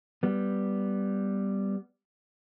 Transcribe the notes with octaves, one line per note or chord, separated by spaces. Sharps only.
G3 B3